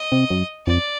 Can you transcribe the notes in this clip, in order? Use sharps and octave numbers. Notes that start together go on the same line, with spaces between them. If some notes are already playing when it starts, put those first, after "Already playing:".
Already playing: D#5
C3
F#2
F2 D5